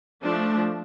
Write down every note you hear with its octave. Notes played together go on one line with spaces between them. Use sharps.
F3 A3 D4